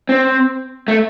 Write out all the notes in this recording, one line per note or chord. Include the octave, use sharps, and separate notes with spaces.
C4
A3